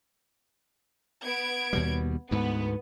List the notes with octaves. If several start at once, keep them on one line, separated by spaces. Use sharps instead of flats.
B3 G#6 D7
D#2 B2 G3
D2 G#2 B3